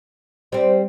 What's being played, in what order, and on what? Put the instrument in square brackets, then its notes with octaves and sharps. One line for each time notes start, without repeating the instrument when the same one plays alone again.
[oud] G3 C4 [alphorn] C5